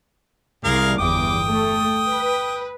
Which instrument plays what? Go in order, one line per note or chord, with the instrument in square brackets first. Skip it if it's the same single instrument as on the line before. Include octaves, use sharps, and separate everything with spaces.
[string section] C2 [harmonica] G#4 A#4 F5
[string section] G1 E2 D6 [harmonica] G5 D#6
[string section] A3
B4